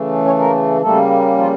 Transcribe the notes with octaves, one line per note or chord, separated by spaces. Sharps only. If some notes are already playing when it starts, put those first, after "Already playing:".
Already playing: C#3 E3 A3
C#4 C#5
A#3 A#4
C#3 G3 A3 A#3 A4
F3 F4